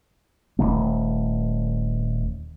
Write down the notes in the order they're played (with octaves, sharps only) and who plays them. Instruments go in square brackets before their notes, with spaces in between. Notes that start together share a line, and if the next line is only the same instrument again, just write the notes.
[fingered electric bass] D#1 E2 D#3 A3